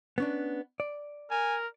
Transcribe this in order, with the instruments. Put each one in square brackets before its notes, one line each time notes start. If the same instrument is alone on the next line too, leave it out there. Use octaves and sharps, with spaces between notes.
[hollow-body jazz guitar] B3 C#4 D4
D5
[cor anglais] A#4 [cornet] G#5